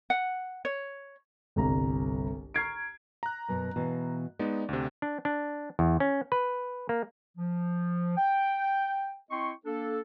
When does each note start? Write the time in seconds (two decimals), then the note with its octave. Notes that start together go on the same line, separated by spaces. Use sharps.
0.10 F#5
0.65 C#5
1.56 G1 C2 A#5
2.54 A#5 C#6 F6 G#6 C7 D7
3.23 A#5 F#6
3.48 F#2 B2 C#5
3.76 B2 E3 F5
4.39 G#3 B3 D#4 D5
4.69 D2 C3
5.02 D4
5.25 D4
5.79 E2
6.00 C#4
6.32 B4
6.89 A#3
7.37 F3
8.17 G5
9.31 C4 E4 D#5 G5 C6 C#6
9.65 A#3 D4 A4